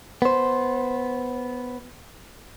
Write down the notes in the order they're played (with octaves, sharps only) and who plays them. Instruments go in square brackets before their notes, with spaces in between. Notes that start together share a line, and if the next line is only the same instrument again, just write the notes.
[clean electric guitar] B3 C5